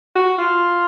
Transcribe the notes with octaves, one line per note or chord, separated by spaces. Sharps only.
F#4
F4